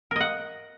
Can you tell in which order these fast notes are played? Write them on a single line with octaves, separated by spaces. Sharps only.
A#4 D#5 F#5